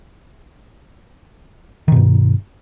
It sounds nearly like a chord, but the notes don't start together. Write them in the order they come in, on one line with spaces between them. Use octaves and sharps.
D#3 B2 G2